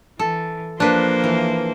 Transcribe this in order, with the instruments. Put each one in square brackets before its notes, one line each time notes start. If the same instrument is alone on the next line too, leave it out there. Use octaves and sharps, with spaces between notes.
[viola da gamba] E3 [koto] A4
[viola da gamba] F3 A#3 C5 [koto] D4 B4
[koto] E3